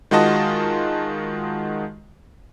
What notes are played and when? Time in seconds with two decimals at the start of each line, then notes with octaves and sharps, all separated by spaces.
0.11 D#3 G#3 F4 F#4 D#5 A5